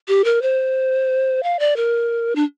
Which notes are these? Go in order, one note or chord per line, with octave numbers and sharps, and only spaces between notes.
G4
A#4
C5
F5
D5
A#4
D4